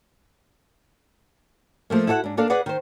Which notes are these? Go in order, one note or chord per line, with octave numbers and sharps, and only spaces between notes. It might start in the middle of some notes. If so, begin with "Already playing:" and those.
F3 A3 A#3
E4 F#4 A4 C#5 F#5
G#2 D4
A#3 D4 A4 D5 F5
G#4 B4 D5 F#5
D#3 C5